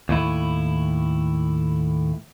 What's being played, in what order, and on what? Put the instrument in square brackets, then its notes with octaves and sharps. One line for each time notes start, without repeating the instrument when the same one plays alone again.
[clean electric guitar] D#2 A2 E4